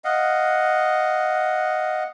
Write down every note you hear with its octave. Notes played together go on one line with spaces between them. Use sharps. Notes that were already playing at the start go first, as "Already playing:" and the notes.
D#5 F5 F#5